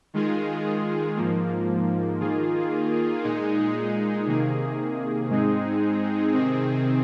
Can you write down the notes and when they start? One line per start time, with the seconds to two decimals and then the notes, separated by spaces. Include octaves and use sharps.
0.14 D#3 G#3 F4 G#4
1.17 G#2 F3 A#3
2.20 D#3 A#3 F4 G#4
3.24 A#2 G#3 D#4 G#4
4.27 C3 D#3 A#3 G#4
5.30 G#2 G#3 C4 D#4 G#4
6.33 C3 D#3 C4 G#4